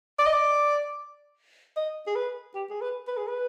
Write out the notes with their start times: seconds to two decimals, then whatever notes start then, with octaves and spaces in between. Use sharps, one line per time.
0.19 D5
0.26 D#5
0.34 D5
1.76 D#5
2.07 G#4
2.16 B4
2.55 G4
2.70 G#4
2.81 B4
3.08 B4
3.17 G#4
3.27 B4